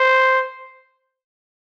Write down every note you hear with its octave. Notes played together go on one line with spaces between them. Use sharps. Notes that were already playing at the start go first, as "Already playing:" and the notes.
Already playing: C5